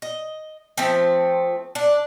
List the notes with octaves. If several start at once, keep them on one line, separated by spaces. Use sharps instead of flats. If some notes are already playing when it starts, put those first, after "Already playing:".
D#5
F3 A3 C4
D4